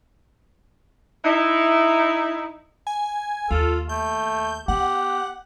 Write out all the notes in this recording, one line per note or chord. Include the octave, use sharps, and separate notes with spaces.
D#4 E4
G#5
D#2 F4 A4
A3 G6
B3 G4 F#5